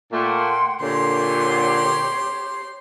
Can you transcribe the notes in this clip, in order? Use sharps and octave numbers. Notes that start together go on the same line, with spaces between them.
A#2 A3 A#3 F#5 G5 C6
A#2 D3 G4 C#5 C6 G6